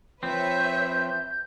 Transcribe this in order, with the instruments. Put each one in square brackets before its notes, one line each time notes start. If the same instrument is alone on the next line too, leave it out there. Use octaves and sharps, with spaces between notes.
[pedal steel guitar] F3 C4 [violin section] B4 C#5 E5 [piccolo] G6